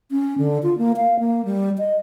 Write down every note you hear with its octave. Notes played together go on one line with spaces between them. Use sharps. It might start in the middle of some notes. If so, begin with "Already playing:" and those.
C#4
D3
F4
A#3
F5
A#3
G3
D#5